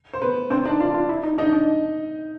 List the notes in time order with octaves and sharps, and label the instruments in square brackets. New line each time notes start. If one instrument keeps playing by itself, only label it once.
[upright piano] C5
B3 B4
[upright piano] C4 C5 [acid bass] D4
[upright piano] D4 D5 [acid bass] D#4
[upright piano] D4 D5 [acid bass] F4
[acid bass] F4
E4
D#4
[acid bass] D4 [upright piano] D#4 D#5
[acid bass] D4